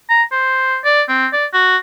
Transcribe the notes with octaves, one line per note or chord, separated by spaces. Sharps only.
A#5
C5
D5
C4
D5
F#4